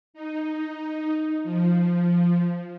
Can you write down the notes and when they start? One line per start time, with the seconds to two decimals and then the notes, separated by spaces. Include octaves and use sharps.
0.14 D#4
1.44 F3